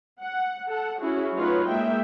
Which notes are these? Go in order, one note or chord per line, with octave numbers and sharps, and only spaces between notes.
F#5
A4 F#5
C#4 E4 F#4 G#4
F#3 A3 D#4 F4 B4 C#5
G#3 A#3 E5 G5